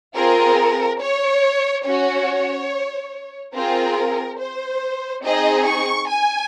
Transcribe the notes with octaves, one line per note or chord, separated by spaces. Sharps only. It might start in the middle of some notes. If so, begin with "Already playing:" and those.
C4 F4 G#4 A#4
C#5
C#4 F#4 C#5
C4 F4 G#4 A#4
C5
C4 D#4 G#4 D#5
C#6
G#5